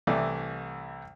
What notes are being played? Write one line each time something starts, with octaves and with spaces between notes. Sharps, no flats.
C2 E3 A3 D5